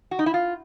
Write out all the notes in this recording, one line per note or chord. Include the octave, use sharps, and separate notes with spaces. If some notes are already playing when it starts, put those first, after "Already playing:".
F#4
D#4
E4
F4